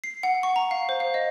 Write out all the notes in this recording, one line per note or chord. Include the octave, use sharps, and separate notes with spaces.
C7
F#5
C#6
A#5
F5
C5
F5
D#5